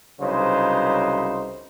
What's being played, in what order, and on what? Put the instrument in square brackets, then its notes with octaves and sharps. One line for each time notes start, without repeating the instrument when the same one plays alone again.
[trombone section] C2 C#3 F#3 D#4 B4 C5